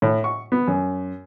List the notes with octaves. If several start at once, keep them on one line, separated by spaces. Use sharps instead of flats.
A2
C#6
B3
F#2